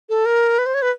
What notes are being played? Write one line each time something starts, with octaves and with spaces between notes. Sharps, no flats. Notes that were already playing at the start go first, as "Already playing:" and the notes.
A4
A#4
B4
C5
C#5
B4